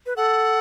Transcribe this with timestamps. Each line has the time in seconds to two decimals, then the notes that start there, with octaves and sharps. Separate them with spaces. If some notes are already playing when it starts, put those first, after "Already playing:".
0.06 B4
0.16 A4 F#5